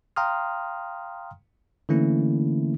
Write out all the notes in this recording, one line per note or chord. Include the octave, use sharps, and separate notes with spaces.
F5 G5 A#5 C6 D#6 F6
D3 E3 A3 A#3 C#4 E4